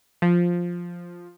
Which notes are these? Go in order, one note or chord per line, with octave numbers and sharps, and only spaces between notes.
F3